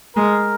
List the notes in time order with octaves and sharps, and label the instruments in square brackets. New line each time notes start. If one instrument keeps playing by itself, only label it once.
[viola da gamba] G#3 [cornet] A#4